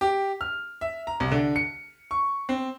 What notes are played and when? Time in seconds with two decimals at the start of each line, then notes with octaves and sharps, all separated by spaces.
0.01 G4
0.41 F6
0.81 E5
1.07 A#5
1.20 C2
1.31 D3
1.56 C#7
2.11 C#6
2.49 C4